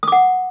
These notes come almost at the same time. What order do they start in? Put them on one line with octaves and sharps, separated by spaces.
D#6 D6 F#5